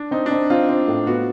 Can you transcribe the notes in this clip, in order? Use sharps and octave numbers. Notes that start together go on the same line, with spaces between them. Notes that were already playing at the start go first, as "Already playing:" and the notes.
Already playing: D4
C4 D#4
D4
C4 D#4
C4 F4
C4
A2
B3 F#4